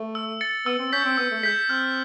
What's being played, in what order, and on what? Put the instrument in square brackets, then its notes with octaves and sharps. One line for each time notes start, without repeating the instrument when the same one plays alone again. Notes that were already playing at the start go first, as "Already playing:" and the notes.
Already playing: [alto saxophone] A3
[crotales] E6
A6 C#7
[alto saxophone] B3 [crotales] E6
[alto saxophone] C4
[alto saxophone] C#4 [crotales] G6 B6
[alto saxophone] C4
[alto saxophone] B3 [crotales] E6
[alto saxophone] A3
[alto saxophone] G#3 [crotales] G6 B6
[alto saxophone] C4 [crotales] F6